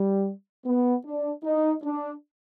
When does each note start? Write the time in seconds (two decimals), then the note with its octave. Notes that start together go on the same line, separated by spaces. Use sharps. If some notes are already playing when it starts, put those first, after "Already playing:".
Already playing: G3
0.66 B3
1.05 D4
1.44 D#4
1.84 D4